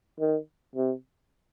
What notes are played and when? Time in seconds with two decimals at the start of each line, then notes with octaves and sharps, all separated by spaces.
0.20 D#3
0.75 C3